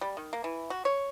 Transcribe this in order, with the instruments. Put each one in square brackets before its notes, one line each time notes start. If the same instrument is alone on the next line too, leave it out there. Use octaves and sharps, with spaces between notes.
[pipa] G3
D#3
A#3
E3
F#4
C#5